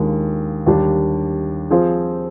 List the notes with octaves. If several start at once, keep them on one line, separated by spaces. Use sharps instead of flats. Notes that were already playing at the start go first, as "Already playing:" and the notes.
Already playing: D#2 D#3 G#3 D4 F4
D#2 D3 G3 D4 G4
F3 C4 F4 G#4 C5